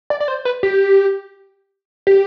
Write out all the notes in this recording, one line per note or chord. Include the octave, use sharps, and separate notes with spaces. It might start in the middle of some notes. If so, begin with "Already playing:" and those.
D5
D5
C5
B4
G4
G4